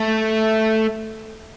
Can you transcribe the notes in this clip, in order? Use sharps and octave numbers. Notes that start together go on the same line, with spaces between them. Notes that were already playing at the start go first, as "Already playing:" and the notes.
Already playing: A3